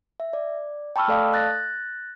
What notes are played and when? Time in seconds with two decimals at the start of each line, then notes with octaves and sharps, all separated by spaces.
0.20 E5
0.33 D5
0.96 G5 A5 B5 C#6 E6 F6
1.08 A3 A4 D5 F5 A5 D#6
1.34 F#6 A6 A#6